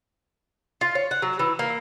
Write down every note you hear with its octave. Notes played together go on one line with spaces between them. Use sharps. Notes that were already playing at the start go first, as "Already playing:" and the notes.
F4
C#5
F#5
F#3
E3
A#3